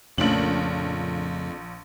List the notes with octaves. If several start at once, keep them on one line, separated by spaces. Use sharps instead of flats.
A#1 F2 C#3 A3 A#3 F#7